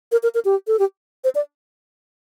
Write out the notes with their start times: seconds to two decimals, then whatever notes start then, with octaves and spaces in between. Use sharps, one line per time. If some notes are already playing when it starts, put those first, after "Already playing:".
0.12 A#4
0.23 A#4
0.34 A#4
0.45 G4
0.67 A4
0.79 G4
1.24 C5
1.35 D5